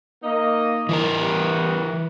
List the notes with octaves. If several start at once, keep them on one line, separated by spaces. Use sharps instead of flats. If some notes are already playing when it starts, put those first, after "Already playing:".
A#3 D#4 D#5
E3 E4 A#4
G3 B3 B4